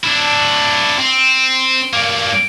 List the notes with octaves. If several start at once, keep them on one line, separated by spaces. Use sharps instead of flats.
D4 E4
C4
G2 A#3